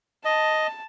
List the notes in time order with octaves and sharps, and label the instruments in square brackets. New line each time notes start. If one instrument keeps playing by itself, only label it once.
[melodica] D#5 [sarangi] A5